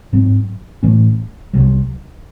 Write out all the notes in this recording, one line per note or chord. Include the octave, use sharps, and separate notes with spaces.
G#2 F#3 C4
A2 E3 A3 C#4
C2 C3 F#3